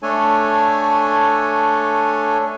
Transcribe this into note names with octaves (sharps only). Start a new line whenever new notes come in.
A3 D4 A4 C#5 G#5